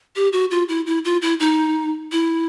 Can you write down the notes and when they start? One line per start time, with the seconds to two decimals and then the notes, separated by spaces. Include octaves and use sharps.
0.16 G4
0.33 F#4
0.51 F4
0.69 E4
0.86 E4
1.05 F4
1.22 E4
1.40 D#4
2.12 E4